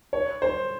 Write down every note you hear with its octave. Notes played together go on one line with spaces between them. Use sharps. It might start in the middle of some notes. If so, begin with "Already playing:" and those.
C#5
C5